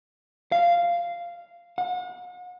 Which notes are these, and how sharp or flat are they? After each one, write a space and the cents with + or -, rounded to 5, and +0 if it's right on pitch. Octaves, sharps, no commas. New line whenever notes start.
F5 -10
F#5 -40